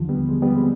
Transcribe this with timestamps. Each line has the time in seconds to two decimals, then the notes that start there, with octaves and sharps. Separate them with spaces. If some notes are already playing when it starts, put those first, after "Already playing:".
Already playing: D#2 D3 F3
0.09 G3 B3
0.29 G#3
0.42 G3 B3
0.55 G#3 C4